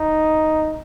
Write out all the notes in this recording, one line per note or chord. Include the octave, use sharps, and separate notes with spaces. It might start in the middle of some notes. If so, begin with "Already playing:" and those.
Already playing: D#4